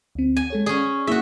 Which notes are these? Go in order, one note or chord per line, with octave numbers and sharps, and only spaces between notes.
D2 C4
G#5
G#3 A4 C#5
C#4 G#4 D5
A#3 E4 F#4 G#4 E5